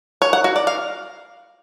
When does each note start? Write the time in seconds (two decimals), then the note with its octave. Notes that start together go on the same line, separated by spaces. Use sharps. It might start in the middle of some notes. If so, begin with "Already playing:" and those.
0.22 C#5
0.33 F#5
0.44 F#4
0.56 D5
0.67 F5